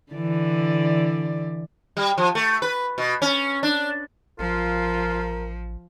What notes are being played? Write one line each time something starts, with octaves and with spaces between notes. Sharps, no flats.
D3 E3 D5
G3
F3
A3
B4
B2
C#4
D4
A1 F3 F4 A#4